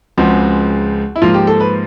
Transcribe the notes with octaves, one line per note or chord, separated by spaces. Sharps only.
C#2 C#3 F3 G#3 C4 F#4
E4
G#2 F3 A#3 F4
G4
A4
B4